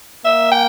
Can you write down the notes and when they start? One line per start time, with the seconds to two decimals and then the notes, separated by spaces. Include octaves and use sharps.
0.25 A#3 E5
0.52 G5